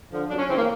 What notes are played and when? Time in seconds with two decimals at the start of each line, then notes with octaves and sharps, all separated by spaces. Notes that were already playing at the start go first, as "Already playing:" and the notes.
0.11 D3 F3
0.29 F#2 D4
0.39 C#4
0.49 C#3 E3 C4
0.58 A#3